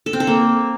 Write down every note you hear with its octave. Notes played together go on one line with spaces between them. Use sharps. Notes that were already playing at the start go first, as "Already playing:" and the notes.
A4
C4
A4
A#3